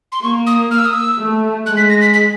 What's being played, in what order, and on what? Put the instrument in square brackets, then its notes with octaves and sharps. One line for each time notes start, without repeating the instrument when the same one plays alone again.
[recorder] C6
[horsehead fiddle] A#3 [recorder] C#6
[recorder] D#6
F6
E6
D#6
E6
[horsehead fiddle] A3
[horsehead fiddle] G#3 [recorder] F#6
[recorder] B6
A#6
B6
B6